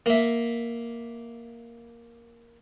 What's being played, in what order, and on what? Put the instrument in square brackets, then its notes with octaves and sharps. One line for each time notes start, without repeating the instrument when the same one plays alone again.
[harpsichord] A#3 E5